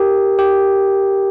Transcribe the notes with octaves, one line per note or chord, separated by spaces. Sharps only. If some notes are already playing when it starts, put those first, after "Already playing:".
Already playing: G4 A#4
G4